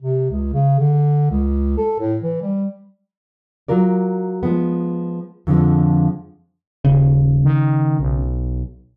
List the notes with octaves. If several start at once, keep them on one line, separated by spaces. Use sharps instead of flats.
C3
C#2
C#3
D3
C#2
A4
A2
E3
G3
F#3 F4 A#4 D5
F3 G#3 B3
F2 D3 E3 F3 G#3
D#1 C#3
D#3
B1